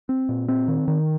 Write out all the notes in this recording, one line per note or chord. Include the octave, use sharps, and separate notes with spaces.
C4
A#2
C4
D#3
D#3